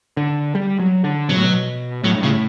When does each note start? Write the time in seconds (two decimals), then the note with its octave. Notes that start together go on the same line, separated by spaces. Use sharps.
0.17 D3
0.55 G3
0.80 F#3
1.04 D3
1.29 B2 F#3
1.37 A2
1.44 B2
2.03 A2 F#3
2.14 G2
2.23 A2 C#3